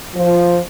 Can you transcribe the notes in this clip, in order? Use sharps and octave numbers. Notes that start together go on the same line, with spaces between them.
F3